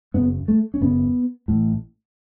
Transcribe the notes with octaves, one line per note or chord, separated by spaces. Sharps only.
F#1 F#2 C#3 B3
A3
C#4
F#1 F#2 C#3 B3
A1 A2